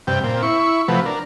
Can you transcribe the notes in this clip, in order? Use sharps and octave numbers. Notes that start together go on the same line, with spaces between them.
G2 C3 G5
A#2 C4
E4 C#6
C3 F3 F#3 A3 B4
D4 A#4